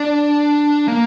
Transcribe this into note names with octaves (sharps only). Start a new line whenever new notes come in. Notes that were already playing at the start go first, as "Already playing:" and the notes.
Already playing: D4
A#3